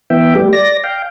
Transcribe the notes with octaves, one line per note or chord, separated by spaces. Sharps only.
E3 B3 E5 G5
G3 A3 G4
D5 A#6
F5 G5